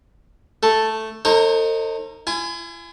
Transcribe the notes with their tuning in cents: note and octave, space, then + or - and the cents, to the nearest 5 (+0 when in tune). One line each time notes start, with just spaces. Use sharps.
A3 +0 A4 +0
D#4 +0 A4 +40 C5 +40
E4 +45 G#5 -5